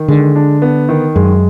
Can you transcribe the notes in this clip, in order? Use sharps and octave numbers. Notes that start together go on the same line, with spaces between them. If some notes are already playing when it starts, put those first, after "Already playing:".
Already playing: D#3
D3 G#3
D4
B3
D#3
F#2 G#3